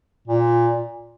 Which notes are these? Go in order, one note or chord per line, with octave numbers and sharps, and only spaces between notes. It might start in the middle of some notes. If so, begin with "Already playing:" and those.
A#2